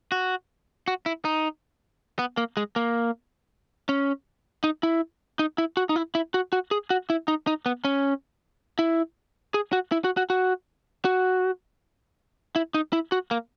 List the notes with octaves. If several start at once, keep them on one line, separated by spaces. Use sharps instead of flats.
F#4
F#4
E4
D#4
B3
A#3
G#3
A#3
C#4
D#4
E4
D#4
E4
F#4
D#4
E4
E4
F#4
F#4
G#4
F#4
E4
D#4
D#4
B3
C#4
E4
G#4
F#4
E4
F#4
F#4
F#4
F#4
E4
D#4
E4
F#4
A#3